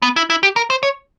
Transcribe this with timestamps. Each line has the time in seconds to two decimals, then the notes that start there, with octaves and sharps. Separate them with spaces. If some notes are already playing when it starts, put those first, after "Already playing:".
0.02 B3
0.16 E4
0.30 E4
0.43 G4
0.56 A#4
0.70 C5
0.83 C#5